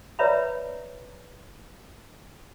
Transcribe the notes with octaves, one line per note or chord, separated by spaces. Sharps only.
B4 C#5 D5 E5 A#5 B5